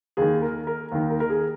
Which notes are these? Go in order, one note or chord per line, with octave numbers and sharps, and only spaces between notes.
D#2 D#3 G#4
A#4
A#4
D#2 D#3
A#4
A#4
G#4